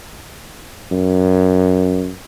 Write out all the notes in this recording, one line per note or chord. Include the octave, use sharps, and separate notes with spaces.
F#2